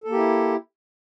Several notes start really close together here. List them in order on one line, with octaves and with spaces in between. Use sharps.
A4 A#3 G4 E4